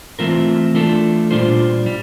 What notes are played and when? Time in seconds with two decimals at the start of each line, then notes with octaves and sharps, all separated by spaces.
0.19 E3 A3 C4 F4 A#4
0.74 E3 A3 D4 F4 A4
1.31 A#2 G3 D4 F4 C5
1.86 G3